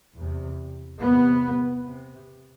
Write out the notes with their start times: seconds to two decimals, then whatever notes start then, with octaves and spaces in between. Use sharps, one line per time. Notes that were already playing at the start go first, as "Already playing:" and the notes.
0.15 E2 C3
1.00 E2 C3 B3
1.85 C3